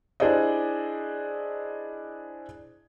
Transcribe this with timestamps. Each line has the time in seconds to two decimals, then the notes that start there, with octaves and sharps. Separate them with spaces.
0.20 D4 E4 G#4 C5 D5 D#5